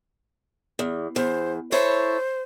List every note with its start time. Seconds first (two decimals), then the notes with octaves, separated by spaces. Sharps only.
0.79 E2
1.16 E2 C5
1.72 E4 A4 C5 C#5